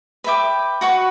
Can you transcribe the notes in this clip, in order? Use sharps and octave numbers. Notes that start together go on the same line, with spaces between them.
B4 E5 G5 D6
F#4 B4 F#5 C#6